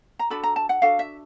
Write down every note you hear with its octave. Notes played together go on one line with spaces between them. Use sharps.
A#5
D4 F#4 A4 B5
A#5
A5
F#5
D4 F#4 A4 F5
E5